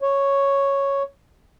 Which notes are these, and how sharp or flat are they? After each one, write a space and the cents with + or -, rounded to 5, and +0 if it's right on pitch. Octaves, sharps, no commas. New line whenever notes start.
C#5 -5